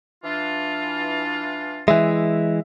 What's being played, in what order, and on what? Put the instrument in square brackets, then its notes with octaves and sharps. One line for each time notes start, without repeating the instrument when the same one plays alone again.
[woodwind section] E3 D4 F4
[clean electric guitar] E3 G#3 [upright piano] E5